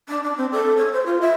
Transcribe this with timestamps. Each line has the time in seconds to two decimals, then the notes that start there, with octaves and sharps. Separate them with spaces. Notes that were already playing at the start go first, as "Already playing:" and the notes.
0.09 D4
0.23 D4
0.37 C4
0.52 A4
0.77 C#5
0.93 C5
1.06 F4
1.21 E5